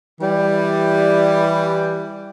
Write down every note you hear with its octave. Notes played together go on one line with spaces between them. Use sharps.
E3 G3